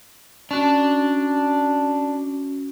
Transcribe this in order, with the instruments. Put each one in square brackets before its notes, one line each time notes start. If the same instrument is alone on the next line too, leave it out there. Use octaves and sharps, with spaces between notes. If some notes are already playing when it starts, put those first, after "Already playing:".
[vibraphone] C#4 F#4 [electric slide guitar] D4